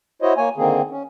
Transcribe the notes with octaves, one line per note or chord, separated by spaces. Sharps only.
E4 F#4 C5 C#5 D#5
A#3 C#5 G#5
D3 D#3 A#3 C4 G#4
C#4